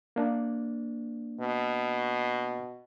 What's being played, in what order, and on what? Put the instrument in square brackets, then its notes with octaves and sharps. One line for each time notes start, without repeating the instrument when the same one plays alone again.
[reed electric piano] A#3 D4
[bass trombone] B2